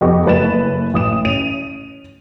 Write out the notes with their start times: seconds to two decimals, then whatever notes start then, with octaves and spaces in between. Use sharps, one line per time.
0.01 F2 B3 G4 D#5 C#6
0.25 F#1 A3 B4 A6 E7
0.94 A1 D#6 E7
1.25 C#4 D#7 F7